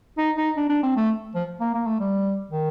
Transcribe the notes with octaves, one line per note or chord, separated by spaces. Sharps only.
D#4
D#4
D4
D4
C4
A3
F3
A#3
A#3
A3
G3
D#3